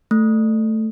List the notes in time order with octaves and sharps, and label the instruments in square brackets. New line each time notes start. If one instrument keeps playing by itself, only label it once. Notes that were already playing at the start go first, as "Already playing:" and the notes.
[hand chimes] A3